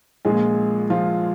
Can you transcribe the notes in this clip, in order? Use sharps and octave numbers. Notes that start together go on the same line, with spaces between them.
A#1 A#2 G#3 G#4
F3 F4